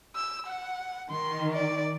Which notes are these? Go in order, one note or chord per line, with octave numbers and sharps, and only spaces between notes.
E6
F#5
D#3 C6
D5